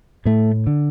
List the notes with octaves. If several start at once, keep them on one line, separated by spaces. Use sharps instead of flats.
A2 A3
D3